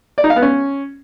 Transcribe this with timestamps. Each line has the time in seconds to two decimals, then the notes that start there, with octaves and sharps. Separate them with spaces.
0.18 D5
0.24 D#4
0.30 F5
0.36 B3
0.42 C#4